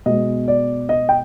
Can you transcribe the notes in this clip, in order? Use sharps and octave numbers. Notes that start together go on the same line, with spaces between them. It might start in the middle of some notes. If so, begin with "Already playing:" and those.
B2 G#3 B3 D#5
D5
D#5
G5